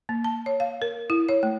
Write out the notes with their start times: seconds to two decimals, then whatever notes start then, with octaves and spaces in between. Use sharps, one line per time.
0.09 A#3
0.24 A5
0.46 C#5
0.60 F5
0.82 A#4
1.10 E4
1.29 C#5
1.43 A3